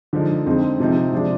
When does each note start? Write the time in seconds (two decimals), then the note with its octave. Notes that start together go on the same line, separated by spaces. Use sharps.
0.13 D3 F3 G#3 D#4
0.46 F2 D3 G#3 C4 D#4
0.80 C3 F3 C4 D#4
1.13 C3 F3 G#3 D4